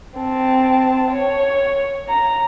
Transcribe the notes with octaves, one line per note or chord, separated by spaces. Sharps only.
C4 A5
C#5
A#5